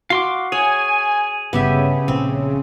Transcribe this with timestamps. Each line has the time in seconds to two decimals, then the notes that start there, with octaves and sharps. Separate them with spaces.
0.10 F#4 F5 C6 D6
0.52 G#4 C#5 G#5
1.53 G1 C#3 B3 G4 E5
2.08 A#1 C4